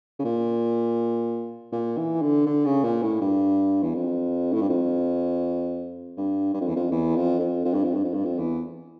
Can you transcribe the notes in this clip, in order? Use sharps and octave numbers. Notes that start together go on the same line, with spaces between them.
C#3
A#2
A#2
E3
D3
D3
C#3
A#2
A2
G2
E2
F2
A2
G2
F2
G2
G2
F2
E2
F2
E2
F2
F2
F2
G2
F2
G2
F2
G2
F2
E2